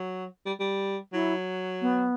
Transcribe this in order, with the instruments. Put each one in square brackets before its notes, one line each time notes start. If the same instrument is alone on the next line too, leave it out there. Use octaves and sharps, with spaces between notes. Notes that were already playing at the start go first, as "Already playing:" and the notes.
Already playing: [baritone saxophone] F#3
G3
G3
[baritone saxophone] F#3 [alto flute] E4
[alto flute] B3